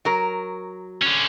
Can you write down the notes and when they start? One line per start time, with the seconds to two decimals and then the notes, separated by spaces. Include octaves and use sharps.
0.05 F#3 A#4
1.02 D3 C#4